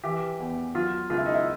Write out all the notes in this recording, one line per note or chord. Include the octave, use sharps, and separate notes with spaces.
E3 G4
E2
F#3 F4
C#2 F4
E4
D#4
E4